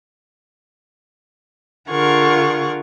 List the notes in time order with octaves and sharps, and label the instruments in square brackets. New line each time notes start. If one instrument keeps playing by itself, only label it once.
[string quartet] D3 F4 G#4 A#4 F#5 C#6